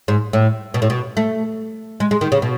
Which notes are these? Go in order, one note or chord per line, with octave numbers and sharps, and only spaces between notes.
G#2
A2
B2
A2
B2
A3
G#3
G#3
D#3
C#3
B2